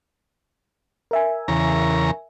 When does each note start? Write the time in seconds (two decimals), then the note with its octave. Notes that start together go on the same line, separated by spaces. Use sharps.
1.11 A#4 E5 G#5
1.48 E2 C#3 A#5